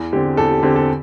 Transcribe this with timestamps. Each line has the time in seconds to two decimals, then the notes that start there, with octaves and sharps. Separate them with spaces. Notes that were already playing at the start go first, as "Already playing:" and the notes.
Already playing: E2
0.13 D3 C4 G4
0.37 E2 A4
0.51 G4
0.63 D3 C4 G4
0.76 A4